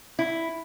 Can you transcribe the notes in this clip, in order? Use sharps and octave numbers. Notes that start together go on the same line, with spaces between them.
E4